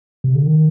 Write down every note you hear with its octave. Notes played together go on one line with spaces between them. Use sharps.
C3
D3
D#3